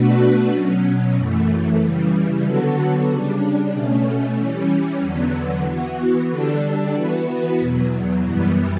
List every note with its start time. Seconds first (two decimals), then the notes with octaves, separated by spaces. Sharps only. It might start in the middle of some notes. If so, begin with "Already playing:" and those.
Already playing: B2 A3 D4 F#4 B4
0.52 B2 F#3 C#4
1.16 F#2 E3 A3
1.81 C#3 E3 G3
2.44 D3 F#3 B3 F#4 A4
3.09 C#3 G3 D4
3.73 B2 A3 C#4
4.38 E3 G3 C#4
5.01 E2 D3 F#3 B3
5.67 E3 B3 F#4
6.30 D3 G3 D4 A4
6.94 E3 B3 F#4 B4
7.59 E2 B2 F#3
8.24 F#2 E3 G3 B3